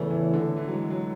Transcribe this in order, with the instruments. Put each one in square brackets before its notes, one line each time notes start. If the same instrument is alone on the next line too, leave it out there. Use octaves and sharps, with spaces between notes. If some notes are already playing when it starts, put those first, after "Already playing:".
Already playing: [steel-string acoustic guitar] E2 C#3 E3 A3 C#4 [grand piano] A2
[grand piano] A2
D3
E3
F#3
G#3
F#3